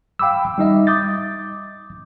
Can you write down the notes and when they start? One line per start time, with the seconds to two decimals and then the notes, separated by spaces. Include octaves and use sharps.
0.19 F5 G5 B5 D6 E6
0.58 G3 D#4 D#5 E5
0.87 D6 D#6 G6 A6